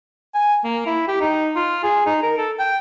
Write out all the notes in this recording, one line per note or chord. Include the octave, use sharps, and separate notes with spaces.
G#5
A#3
E4
G4
D#4
F4
G#4
D#4
A#4
A4
G5